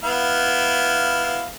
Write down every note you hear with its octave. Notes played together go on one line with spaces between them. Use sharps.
B3 E4 F5